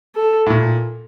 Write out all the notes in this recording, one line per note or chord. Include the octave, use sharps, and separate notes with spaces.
A4
A2
A#2